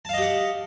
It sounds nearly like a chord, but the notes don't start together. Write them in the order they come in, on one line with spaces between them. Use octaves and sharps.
A5 F5 D#5 G4 F#5